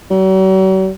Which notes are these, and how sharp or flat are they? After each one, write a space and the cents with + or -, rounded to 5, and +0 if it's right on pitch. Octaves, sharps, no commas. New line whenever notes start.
F#3 +45